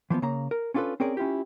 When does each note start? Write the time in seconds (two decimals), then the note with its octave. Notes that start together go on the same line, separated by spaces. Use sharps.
0.10 E3 F3 A#3 B3
0.22 C#3 A#3 A#5
0.51 A#4
0.74 C#4 D4 F4 F#4 A4 B4
1.00 C4 C#4 G#4 A#4 D5
1.17 C#4 E4 F4 G4